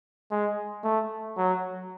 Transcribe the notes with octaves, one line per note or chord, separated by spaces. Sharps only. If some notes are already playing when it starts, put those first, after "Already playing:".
G#3
A3
F#3